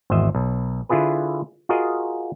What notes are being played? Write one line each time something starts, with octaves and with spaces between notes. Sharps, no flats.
G#1 E2 C5 D#5 E5
B1
D3 E4 F4 G#4 B4
F4 F#4 G#4 A#4 D#5